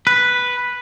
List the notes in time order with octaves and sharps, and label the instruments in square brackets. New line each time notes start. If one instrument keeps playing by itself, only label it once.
[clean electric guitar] B4